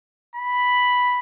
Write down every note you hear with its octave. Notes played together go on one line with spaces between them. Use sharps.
B5